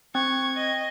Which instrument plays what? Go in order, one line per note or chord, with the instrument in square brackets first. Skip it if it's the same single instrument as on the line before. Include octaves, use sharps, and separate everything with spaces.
[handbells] C4 [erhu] C#6 [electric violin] G#6
[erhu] D#5